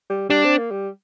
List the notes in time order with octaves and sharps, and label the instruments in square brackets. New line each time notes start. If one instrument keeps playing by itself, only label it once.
[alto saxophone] G3
[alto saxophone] G3 [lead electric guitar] D4
[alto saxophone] C4
A#3
G3